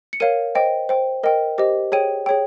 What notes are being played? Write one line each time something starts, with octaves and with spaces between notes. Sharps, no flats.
C#7
A#4 C#5 F5 D#7
C5 D#5 G5
C5 G5
A#4 D#5 G5
G4 C5 D#5
G#4 C#5 G5 D#7
G#4 C#5 G5